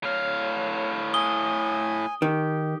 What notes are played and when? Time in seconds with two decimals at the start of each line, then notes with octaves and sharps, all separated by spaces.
0.03 A2 C#5 F5
1.14 G#5 D#6 G7
2.22 D#3 G4